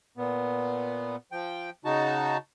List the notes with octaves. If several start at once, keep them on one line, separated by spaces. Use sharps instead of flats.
A#2 B3
F3 G5
C#3 D#4 F#4 A5